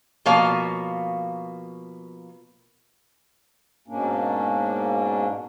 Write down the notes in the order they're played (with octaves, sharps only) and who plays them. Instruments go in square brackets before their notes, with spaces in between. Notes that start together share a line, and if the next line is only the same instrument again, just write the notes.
[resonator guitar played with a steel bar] B2 F3 A#3 C#5 F5
[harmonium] G#2 B2 A#3 C#4 D4